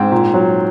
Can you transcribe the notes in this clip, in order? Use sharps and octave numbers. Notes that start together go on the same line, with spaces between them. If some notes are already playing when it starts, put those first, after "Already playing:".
Already playing: G#2 C4
A#2
F#3